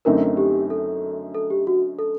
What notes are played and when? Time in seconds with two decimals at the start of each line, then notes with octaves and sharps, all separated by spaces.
0.05 F#2 D3 A3 C4 D#4 A#4
0.37 G4
0.70 A4
1.34 A4
1.50 G4
1.67 F#4
1.99 A4